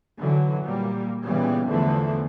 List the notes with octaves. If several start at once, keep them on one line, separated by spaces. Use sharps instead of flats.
D3 E3 F#3
A#2 G3 A#3
A#2 C#3 E3 G3 B3
E2 D3 E3 F3 A3